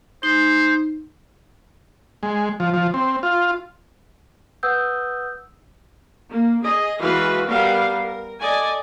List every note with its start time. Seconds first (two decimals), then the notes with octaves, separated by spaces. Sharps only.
0.23 D#4 C5
2.23 G#3
2.60 F3
2.74 F3
2.94 C4
3.23 F4
4.63 B4 F#5 D#6 E6 G6
6.30 A#3
6.63 G#4 D#5
7.00 E3 G#3 F#4 B4 F5
7.47 G3 B3 A#4 F5
8.04 A#4
8.42 A4 D5 D#5 G#5